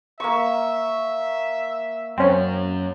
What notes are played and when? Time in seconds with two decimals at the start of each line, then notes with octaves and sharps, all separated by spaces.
0.20 A#3 E5 C#6
2.18 F#2 C4 C#4